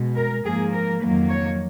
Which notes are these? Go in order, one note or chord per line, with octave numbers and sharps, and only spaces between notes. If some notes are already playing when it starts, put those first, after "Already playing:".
Already playing: B2 G#3
A#4
G#2 F3 A#3 G#4
A#4
F2 D#3 F#3 A#3 B4
C#5